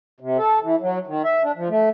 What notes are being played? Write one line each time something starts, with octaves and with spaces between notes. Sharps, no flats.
C3
A4
E3
F#3
D#3
E5
D4
F3
A3